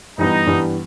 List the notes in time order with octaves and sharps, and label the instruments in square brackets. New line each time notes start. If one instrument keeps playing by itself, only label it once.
[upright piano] G2 E3 G3 B3 [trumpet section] D#4
[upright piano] G2 E3 G3 B3